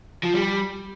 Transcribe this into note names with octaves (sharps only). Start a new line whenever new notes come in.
F3
G3